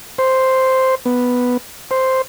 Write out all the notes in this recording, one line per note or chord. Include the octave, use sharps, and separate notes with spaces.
C5
B3
C5